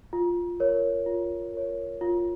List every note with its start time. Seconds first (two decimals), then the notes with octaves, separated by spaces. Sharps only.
0.13 F4
0.60 A#4 C#5
1.06 F4
1.54 A#4 C#5
2.01 F4